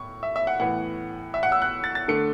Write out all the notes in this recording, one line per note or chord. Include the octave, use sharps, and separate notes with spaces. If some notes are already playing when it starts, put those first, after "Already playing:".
Already playing: A2 C#6
E5
E5
F#5
A2 E3 B3 F#5
E5
F#5
E6
F#6
A6
A6
D3 A3 C#7